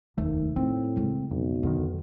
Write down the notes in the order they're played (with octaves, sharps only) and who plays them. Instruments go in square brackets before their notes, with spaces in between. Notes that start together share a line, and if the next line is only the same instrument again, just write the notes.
[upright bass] F1 [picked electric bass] D#2 A3 [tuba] D#3
[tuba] A2 [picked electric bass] C4 [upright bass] D#4
[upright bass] C#3 G#3
[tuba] B1 [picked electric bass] F2
[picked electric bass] D1 D3 D#3 [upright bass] F2